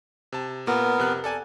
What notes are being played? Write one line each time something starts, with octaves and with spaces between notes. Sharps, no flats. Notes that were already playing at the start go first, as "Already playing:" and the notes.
C3 A5
A#2 B3 A#4
F2 C3 F#6
A4 D5 G#5